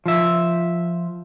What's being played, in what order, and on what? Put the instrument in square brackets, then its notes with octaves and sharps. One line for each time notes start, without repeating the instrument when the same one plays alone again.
[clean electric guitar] F3 E5